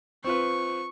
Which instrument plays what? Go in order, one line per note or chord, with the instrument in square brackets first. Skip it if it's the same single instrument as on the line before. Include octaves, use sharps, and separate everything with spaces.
[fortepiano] C4 F4 B4 [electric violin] C#6